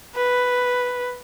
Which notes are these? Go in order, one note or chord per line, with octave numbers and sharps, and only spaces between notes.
B4